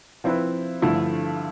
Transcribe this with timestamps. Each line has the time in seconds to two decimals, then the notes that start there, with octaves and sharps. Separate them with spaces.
0.24 F3 C4 E4 B4
0.82 G2 D3 F3 A3 E4